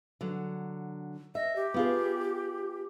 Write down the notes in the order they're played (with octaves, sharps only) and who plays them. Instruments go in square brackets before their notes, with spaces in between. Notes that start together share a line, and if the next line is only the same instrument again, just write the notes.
[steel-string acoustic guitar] D3 F#3
[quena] D#5 [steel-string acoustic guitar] E5
[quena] G4
[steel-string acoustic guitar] B3 F4 G#4